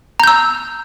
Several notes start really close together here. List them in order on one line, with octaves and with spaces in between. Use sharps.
A#5 G6 E6